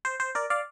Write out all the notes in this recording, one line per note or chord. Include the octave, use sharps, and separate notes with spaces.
C5
C5
A#4 D5
D5 F5